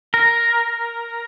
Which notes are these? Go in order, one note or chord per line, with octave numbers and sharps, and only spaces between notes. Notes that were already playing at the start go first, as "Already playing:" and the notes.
A#4